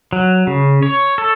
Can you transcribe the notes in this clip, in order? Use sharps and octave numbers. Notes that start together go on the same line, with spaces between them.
F#3
C#3
C#5
A4